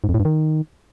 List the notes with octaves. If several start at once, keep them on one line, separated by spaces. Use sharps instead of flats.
G#2
F2
A2
G2
D#3